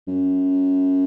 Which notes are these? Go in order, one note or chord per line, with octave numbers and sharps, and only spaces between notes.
F#2